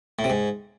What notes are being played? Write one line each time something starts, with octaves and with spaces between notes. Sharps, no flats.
A2
C3
G#2